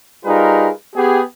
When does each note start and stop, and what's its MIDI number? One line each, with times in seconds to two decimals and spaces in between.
0.25 0.70 55
0.25 0.70 63
0.25 0.70 65
0.25 0.70 68
0.25 0.70 70
0.25 0.70 71
0.95 1.21 59
0.95 1.21 67
0.95 1.21 68